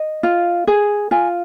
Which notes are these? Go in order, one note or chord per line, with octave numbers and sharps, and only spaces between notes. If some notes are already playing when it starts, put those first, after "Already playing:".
Already playing: D#5
F4
G#4
F4 G#5